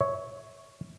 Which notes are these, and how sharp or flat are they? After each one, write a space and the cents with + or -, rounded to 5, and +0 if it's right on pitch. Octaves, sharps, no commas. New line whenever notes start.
C#5 +0 E5 -25